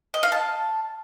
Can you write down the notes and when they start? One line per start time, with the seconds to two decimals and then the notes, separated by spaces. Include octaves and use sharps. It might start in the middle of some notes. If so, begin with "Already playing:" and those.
0.14 D#5
0.23 F5
0.32 A5